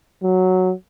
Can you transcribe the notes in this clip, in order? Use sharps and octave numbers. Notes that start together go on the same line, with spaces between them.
F#3